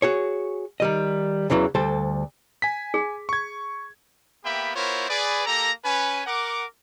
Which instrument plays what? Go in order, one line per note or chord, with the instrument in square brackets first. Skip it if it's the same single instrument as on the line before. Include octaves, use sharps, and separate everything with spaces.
[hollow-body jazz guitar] F#4 G#4 C#5
D#3 G3 D#5
E2 C#3 E3 F#3
D2 G3 A4 C5
[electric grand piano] G#5 B6
[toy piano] G#4
[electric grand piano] C#6 G#6
[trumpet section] A#3 B3 G4 E5 G5 B5
B3 E4 F4 A#4 C5 C#5
G#4 B4 D5
A#3 G4 A4 A#5
C#4 B4 G#5
A#4 F#5 D6